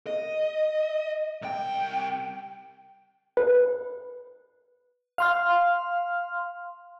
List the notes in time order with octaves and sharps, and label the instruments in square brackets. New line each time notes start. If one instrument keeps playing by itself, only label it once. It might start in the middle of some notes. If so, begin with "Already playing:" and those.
[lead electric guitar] D#5
C2 G5
[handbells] B4
[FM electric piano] F5 C6 F6